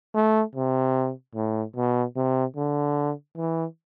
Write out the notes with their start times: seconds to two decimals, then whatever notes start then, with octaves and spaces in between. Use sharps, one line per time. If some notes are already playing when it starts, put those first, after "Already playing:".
0.14 A3
0.55 C3
1.35 A2
1.76 B2
2.16 C3
2.56 D3
3.37 E3